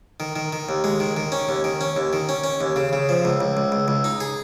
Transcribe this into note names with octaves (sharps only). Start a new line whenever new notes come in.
D#3
D#3
D#3
D#2
G#3
D#3
D#3
C#4
D#2
D#3
C#4
D#2
D#3
C#4
C#4
D#2
C#3
C#3
F3
C#2
C#2
C#2
C#2
C#2
D#4
G#4